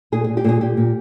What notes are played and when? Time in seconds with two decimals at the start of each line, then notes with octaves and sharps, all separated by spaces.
0.12 A#2 G#4
0.24 G#4
0.29 A#2
0.37 G4
0.44 A#2 G#4
0.61 A#2 G4
0.77 A#2